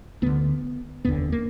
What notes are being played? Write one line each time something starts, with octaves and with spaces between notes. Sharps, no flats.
D2 D3 B3
F1 D#2 D3 B3
A#3